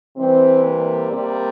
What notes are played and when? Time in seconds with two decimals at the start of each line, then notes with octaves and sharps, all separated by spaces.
0.17 C3 E3 G3 C4
0.64 A#3
1.11 C3 G3